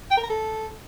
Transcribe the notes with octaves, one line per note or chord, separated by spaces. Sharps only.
G5
A#4
A#5
A4